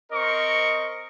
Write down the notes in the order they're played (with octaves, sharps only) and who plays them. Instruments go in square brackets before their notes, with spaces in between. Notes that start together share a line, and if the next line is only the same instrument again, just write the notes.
[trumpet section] C4 A#4 D#5 C#6